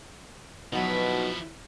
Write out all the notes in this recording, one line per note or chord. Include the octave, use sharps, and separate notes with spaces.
B2 F3 F#3 B3 D#4 E4